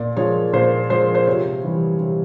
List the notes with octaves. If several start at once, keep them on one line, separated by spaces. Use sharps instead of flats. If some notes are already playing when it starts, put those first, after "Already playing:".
Already playing: A#2 D5
F3 G#3 C#5
A#2 C5
F3 G#3 C5
C5
C3 C#5
E3 G3
C3